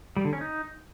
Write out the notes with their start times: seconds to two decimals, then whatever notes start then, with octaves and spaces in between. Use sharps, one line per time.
0.16 G3
0.25 D3
0.33 C#4
0.41 D#4